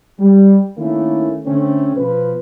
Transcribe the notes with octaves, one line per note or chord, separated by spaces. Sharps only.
G3
D#3 A3 A#3 C#4 E4
D3 A3 C4 C#4
B2 F3 B4